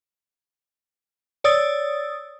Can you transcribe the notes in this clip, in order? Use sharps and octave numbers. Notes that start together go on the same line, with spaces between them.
C#5 D5 D#6 E6 A6